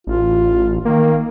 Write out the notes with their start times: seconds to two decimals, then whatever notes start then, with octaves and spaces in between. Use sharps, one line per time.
0.07 A1 F4
0.85 D#3 A#3